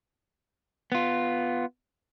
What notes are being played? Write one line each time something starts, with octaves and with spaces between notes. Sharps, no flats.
B3 F4